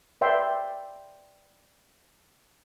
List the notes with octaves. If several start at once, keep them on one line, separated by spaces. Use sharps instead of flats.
B4 D5 E5 G5 C6